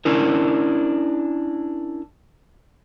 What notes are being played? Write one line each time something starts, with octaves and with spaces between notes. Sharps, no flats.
C#4 D4 E4 A#4